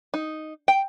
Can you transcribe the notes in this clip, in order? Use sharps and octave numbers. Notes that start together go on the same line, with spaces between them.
D#4
G5